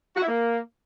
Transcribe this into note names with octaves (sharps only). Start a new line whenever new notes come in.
F#4
E4
A#3